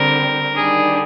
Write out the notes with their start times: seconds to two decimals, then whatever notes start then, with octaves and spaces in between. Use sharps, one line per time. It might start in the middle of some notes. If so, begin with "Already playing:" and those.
Already playing: D3 G3 C4 A#4
0.54 D#3 G3 D4 G#4